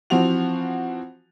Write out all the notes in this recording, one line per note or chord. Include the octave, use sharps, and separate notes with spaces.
E3 F3 C4 F#4 F7